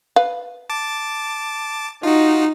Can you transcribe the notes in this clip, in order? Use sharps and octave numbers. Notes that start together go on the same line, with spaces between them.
B4 F5
A5 D6
D#4 F4 F#4